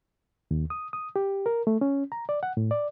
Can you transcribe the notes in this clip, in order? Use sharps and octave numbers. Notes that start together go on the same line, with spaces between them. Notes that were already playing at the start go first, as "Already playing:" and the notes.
D#2
D#6
D#6
G4
A#4
A3
C#4
A#5
D5
F#5
A2
D5